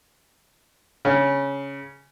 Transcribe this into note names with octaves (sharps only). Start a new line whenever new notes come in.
C#3